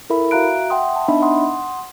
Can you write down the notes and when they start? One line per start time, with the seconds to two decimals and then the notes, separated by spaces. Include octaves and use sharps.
0.10 E4 A4 A#4 E5 B5
0.31 F#4 E5 F5 A#5 F#6 D7
0.70 E5 F#5 G5 C6 D#6
0.96 A5
1.08 B3 D4 D#4 D#5 E5 B5
1.22 F#5 C6 D#6